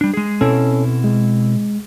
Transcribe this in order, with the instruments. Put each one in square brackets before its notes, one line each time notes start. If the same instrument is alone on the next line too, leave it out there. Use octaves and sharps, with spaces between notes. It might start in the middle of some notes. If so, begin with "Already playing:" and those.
[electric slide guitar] G3 D4
G#3 G#4
[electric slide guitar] B2 C4 E4 [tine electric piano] C#4 A4
[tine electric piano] G#3